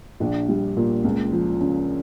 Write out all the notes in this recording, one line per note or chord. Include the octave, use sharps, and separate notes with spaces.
A#1 D4
G3
A#2
C#2
F3
C#3